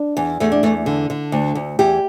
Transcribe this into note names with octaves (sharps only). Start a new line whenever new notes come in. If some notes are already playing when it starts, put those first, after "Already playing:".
Already playing: D4
E2
E2 A3
D4
E2 A3
D3
D3
D2
D2
E2 G4